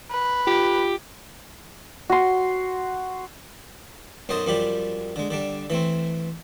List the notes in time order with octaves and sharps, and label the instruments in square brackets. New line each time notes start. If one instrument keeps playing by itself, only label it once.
[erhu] B4
[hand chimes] F4 [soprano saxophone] G4
[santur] F#4 C6
[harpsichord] B1 F#2 F#3 C5 D#5 A5
F#2 F3 G3 G4 B5
D3 G#3
D3 G3 D4
E3 A3 C4